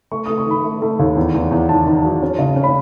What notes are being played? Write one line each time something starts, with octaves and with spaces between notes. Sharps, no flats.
A3 C#6
A3 D#6
C#6
D#3 B5
A3
A3
D#2
E2
E2
E2
D#3 A5
D#3
F#3
C#4
C#3
C#4
B5